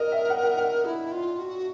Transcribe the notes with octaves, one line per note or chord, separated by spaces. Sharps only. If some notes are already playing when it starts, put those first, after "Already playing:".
Already playing: A#4 D#5
E5
F#5
F#5
F#5
E4
F4
F#4